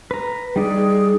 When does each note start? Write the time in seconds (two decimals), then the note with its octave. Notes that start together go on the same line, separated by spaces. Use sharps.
0.11 B4 A#5
0.56 G3 D#4 G#4 D5